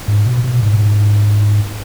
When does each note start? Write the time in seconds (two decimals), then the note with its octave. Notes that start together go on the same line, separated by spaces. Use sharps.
0.08 G#2
0.26 B2
0.44 B2
0.63 G#2